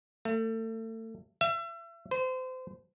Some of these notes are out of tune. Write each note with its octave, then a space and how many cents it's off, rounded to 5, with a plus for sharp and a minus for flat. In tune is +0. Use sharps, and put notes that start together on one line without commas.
A3 +30
E5 +35
C5 -30